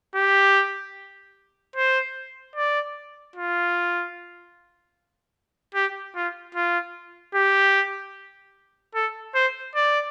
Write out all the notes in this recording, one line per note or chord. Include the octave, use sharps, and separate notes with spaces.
G4
C5
D5
F4
G4
F4
F4
G4
A4
C5
D5